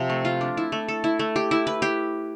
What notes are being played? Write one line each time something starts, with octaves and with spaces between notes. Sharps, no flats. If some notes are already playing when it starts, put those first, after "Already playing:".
Already playing: C3 F3 C4
A3
F4
D4
E4
A3
A4
E4
A3
G4
E4
B4
G4